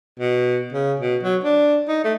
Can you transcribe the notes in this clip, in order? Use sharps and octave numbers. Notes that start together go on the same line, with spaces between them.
B2
C#3
B2
F#3
D4
D#4
A3